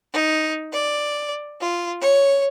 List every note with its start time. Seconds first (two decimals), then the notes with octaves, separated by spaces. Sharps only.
0.12 D#4
0.72 D5
1.59 F4
2.01 C#5